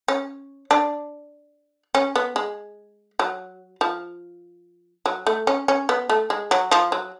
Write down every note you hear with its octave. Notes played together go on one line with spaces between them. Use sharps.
C#4
D4
C#4
B3
G#3
F#3
F3
F#3
A3
C#4
C#4
B3
A3
G#3
F#3
F3
F#3